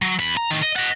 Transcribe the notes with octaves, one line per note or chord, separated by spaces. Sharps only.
F#3
E2 B5
A#5
A2 D#3
D#5
D#5 F#5